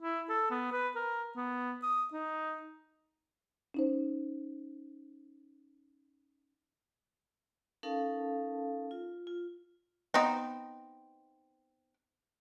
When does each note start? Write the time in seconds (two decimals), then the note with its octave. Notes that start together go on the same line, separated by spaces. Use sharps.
0.01 E4
0.29 A4
0.50 B3
0.72 B4
0.95 A#4
1.36 B3
1.82 D#6
2.13 D#4
3.74 C#4 D#4 C5
7.83 C#4 D#4 A4 A#4 F5 A5
8.91 F4
9.27 F4
10.14 B3 C4 D#4